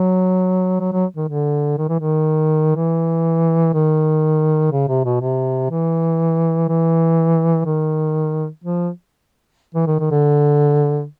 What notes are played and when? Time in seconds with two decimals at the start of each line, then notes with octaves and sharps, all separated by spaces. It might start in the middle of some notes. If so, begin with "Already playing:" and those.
Already playing: F#3
0.80 F#3
0.92 F#3
1.16 D#3
1.29 D3
1.78 D#3
1.89 E3
1.99 D#3
2.76 E3
3.74 D#3
4.72 C#3
4.88 C3
5.05 B2
5.21 C3
5.70 E3
6.68 E3
7.66 D#3
8.64 F3
9.74 E3
9.87 D#3
10.00 D#3
10.11 D3